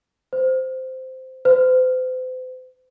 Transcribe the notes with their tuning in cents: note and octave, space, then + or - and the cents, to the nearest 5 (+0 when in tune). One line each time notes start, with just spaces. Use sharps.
C5 -10
C5 -40